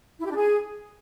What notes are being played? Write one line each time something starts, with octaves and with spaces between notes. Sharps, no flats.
E4
G4
D4
G#4